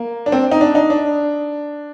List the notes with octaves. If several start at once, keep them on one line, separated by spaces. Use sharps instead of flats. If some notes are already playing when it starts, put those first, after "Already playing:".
Already playing: A#3
D4
C4
D#4
D4
D#4
D4